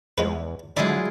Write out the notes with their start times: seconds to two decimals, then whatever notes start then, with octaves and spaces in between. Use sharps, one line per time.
0.18 E2 F3 G#3 B4
0.77 D3 F#3 G#3 E4 F4 G#4 D5 D#5